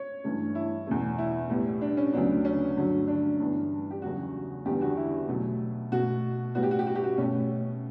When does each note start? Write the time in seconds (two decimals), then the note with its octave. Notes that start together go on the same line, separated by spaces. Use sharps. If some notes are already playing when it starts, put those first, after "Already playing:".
Already playing: C#5
0.24 G2 E3 A3
0.55 E4
0.87 E2 B2 A3
1.18 E4
1.50 A2 G3 B3
1.81 D4
1.97 C#4
2.13 D2 C#3 F#3 B3 D4
2.45 C#4
2.76 G2 D3 F#3 A3
3.08 D4
3.39 G2 E3 B3
3.91 G4
4.02 E2 C#3 F#3 B3 F#4
4.65 E2 D3 G3 B3 G4
4.81 F#4
4.97 E4
5.29 B2 F#3 A3
5.92 B2 A3 F#4
6.55 A2 G3 B3 F#4
6.63 G4
6.71 F#4
6.79 G4
6.87 F#4
6.95 G4
7.04 F#4
7.18 B2 A3 C#4